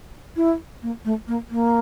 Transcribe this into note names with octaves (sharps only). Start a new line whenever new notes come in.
E4
A#3
A3
A#3
A#3